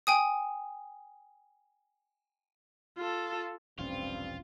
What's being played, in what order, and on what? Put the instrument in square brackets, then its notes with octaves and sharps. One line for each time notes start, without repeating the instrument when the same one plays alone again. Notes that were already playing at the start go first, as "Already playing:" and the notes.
[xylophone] G5 G#5 D#6
[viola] F4 A4
[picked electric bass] E1 A#1 C#4 [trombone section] G2 A#2 C4 [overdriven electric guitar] F4